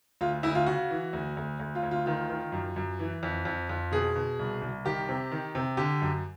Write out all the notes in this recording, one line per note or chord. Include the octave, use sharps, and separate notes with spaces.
D2 F4
D2 E4
F4
C#3 F#4
E3
D2
D2
D2
F4
D2
F4
D#3 F4
D#3
F#2
F#2
E3
F2
F2
F2
B2 G#4
B2
C2
C2
D#3 G4
C3
D#3
C3
D3 G4
F#2